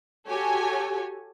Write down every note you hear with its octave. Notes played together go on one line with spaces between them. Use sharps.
F#4 G4 A4 C#5 G#5